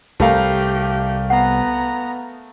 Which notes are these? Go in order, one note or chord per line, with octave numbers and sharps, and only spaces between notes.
C2 A3 G4 A#4 F5
B3 F#5 A#5